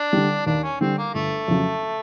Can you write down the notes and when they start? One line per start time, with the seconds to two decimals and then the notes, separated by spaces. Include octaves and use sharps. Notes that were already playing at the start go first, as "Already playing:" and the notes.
Already playing: D4
0.13 D3 G3
0.46 D#2 D4
0.63 C#4
0.80 D3 G3 C4
0.98 A#3
1.14 G1 A3
1.48 F2 C#3 F#3